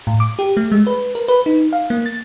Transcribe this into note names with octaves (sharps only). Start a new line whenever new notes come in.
A2
D6
G4
A3
G#3
B4
A#4
B4
D#4
F5
A#3
A6